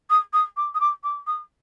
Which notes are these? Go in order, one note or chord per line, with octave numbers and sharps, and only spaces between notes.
D#6
D#6
D6
D#6
D6
D6
D#6